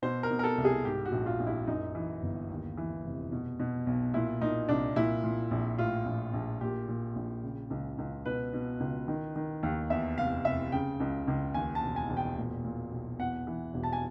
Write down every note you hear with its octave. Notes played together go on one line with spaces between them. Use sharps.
B2 C5
A#4
B2
A#4
A4
C2
G#4
G#2 G4
F#4
A#1
F4
A#1
E4
F#2 D#4
E3
G1
D#2
E3
F1
B2
B2
B1
A#2 E4
A#2 D#4
C2 D4
A#2 E4
A#2
A#1
A2 F4
A#1
A#1
A#2 G4
A#2
A#1
C#3
C#2
C#2
B2 B4
B2
C#2
D#3
D#3
D#2
E2 E5
F1 F5
F1 E5
C#3 G5
C#2
C#2
D#2 G#5
A5
E1
G#5
E1
G5
A#2
A#2
B1
E2 F#5
E3
E1
A5
G#5